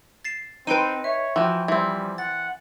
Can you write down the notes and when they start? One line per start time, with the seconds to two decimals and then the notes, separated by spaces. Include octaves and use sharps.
0.25 A6 C7 E7
0.67 C4 D#4 B4 G5 C6 D#7
1.04 C#5 E5
1.36 E3 F3 F#4 G5
1.68 E3 G3 C4
2.18 F#5 A6